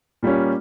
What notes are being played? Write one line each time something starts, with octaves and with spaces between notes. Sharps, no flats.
A#2 G3 A#3 C#4